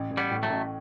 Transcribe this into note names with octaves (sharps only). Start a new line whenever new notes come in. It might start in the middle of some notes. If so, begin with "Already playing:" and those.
Already playing: A1
A1
G3 B3
A2
F#3 A3
A1